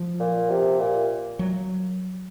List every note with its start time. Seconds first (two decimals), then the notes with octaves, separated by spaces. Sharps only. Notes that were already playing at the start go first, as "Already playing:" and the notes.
Already playing: F3
0.19 A#2
0.49 C3
0.79 A#2
1.39 F#3